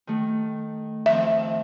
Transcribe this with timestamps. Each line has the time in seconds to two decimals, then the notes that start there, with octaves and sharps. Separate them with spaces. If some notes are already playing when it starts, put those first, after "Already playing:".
0.07 D#3 A3
1.06 D#3 F3 C4 E5